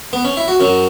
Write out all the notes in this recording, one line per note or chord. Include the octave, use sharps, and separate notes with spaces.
B3
C#4
E4
F#4
F#2 F#3 C#4